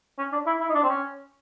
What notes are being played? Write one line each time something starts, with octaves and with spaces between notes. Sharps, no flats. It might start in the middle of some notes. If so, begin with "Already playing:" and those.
C#4
D4
E4
E4
D#4
D4
C4
C#4